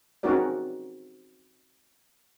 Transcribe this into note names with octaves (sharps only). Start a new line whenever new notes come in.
C4 C#4 D#4 F#4 A#4 D5